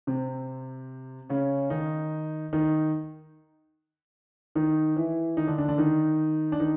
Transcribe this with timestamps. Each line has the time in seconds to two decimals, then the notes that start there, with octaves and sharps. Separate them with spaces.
0.07 C3 C4
1.29 C#3 C#4
1.70 D#3 D#4
2.53 D#3 D#4
4.55 D#3 D#4
4.96 E3 E4
5.37 D#3 D#4
5.47 D3 D4
5.58 D3 D4
5.68 D3 D4
5.78 D#3 D#4
6.52 D4
6.60 D#3 D#4